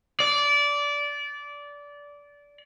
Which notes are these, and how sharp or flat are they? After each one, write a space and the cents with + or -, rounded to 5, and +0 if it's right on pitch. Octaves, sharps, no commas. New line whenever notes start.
D5 -20